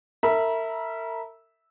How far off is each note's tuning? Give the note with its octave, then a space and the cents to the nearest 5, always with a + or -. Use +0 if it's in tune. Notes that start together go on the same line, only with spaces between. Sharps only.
A#4 -40 E5 -5 B5 -45